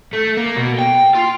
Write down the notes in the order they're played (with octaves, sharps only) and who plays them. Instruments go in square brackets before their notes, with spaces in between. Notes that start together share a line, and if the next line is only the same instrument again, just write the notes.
[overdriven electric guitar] A3
A#3
B2
G5
F4